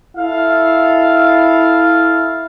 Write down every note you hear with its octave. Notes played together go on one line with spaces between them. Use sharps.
E4 A4 F5